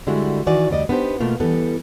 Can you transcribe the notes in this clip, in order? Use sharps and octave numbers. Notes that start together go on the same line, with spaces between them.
D3 G3 G#3 E4 F#4
D#3 E3 F#4 D5 G#5
D2 G3 D5 D#5
B3 D4 D#4 G4 C5
B2 A3 A#3 F4
E3 G3 B3 A4